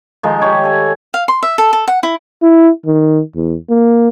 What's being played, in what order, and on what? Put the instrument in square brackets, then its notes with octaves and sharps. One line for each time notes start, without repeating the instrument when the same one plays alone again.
[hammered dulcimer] D#3 F3 G#3
G4 C#5 G5
A4 G#5
[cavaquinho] F5
C6
E5
A4
A4
F#5
E4
[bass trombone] E4
D#3
E2
A#3